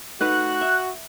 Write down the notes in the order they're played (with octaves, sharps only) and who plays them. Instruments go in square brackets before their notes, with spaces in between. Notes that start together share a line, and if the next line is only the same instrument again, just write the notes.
[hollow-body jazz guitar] A3 D#4 B4 [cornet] F#4 [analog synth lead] F#6
[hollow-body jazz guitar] E5